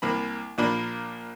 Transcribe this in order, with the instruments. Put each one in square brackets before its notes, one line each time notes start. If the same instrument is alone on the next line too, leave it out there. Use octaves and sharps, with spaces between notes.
[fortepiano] C2 A#3 B5
A#1 A#2 A#3 D4 B5